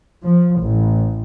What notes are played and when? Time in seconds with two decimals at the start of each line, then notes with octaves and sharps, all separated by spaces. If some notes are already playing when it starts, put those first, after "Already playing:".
0.25 F3
0.62 A1